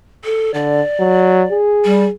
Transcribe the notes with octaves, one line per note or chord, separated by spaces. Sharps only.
A4
D3 D5
F#3
G#4
G3